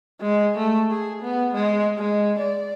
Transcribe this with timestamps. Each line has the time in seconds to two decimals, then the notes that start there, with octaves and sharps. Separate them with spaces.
0.21 G#3
0.58 A3
0.91 G#4
1.23 B3
1.54 G#3
1.98 G#3
2.40 D5